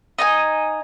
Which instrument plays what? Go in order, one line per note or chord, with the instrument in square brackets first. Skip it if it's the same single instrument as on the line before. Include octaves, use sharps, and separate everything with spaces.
[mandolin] D#4 D#5 G#5